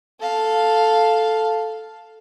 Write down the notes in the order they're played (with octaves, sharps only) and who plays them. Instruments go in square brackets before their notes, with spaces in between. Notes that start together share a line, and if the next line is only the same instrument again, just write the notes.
[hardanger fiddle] A4 F5